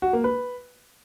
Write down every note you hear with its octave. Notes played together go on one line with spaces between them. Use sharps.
F#4
A#3
B4